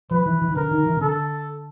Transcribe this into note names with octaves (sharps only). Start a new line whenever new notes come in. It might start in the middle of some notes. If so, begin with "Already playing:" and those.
F3 B4
E3
E3
D#3
D3 A#4
D#3
E3
C#3
D3 A4